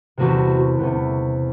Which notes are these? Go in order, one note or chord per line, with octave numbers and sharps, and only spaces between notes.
E2 C3 E3 A3 C#4 F#4
E2 C3 E3 A3 C#4